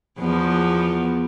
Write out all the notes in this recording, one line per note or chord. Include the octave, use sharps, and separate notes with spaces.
E2 F3 B3